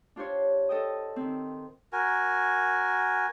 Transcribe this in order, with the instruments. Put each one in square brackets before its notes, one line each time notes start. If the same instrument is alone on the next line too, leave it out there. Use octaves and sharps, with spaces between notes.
[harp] D4 F4 G4 C5 C#5
A4 D#5 G5 D#6
D#3 C4
[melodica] F#4 A#4 G#5